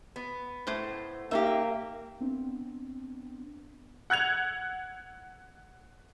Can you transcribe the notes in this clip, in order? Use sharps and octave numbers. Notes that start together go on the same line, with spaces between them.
B3
A2 A3 C5
A#3 D#4 F4 G4 E5
B3 C4 D4
F#5 F#6 G#6 F7